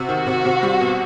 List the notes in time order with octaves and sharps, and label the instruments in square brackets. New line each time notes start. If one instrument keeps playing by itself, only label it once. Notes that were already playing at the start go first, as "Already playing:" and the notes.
Already playing: [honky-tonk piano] C3 [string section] F#4
[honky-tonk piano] D#3
C3
C3
G3
B2